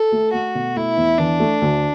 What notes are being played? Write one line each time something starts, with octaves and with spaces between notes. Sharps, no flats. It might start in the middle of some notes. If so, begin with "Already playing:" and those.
Already playing: A4
A3
A3 F#4
B2
A3 E4
E2
E3 D4
A3
D2